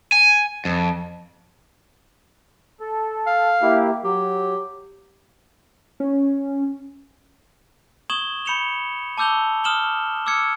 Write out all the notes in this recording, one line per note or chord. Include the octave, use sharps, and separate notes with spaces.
G#5
F2
A4
F5
A#3 E4 G4
F#3 G4
C#4
C#6 D#6 G#6 E7 F#7 G7
B5 G6 C#7 E7 F7 G7
A5 D6 E6 G6 F7 G7
D#6 F6 E7 F#7 G7
D6 E6 F6 G#6 C#7